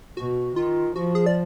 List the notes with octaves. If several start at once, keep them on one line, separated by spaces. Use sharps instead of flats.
B2 F#4
D#3 F4
F3 F#4
G#4
D5